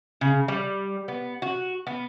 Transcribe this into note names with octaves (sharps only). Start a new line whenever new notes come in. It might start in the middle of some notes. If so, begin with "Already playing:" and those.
C#3
G3
B3
F#4
B3